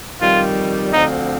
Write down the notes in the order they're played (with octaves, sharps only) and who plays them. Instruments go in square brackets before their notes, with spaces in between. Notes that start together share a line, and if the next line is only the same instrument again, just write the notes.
[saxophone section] F2 D#3 G3 [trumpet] F4
[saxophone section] D2 D3 F3 C4 [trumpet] D#4